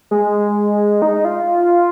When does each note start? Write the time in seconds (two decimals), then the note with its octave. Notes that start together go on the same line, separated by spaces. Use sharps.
0.11 G#3
1.02 D#4
1.25 F4